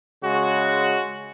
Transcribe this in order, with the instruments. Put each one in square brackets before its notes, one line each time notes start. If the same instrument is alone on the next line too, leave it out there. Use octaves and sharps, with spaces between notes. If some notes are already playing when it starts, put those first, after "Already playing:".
[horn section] C#3 G#3 F#4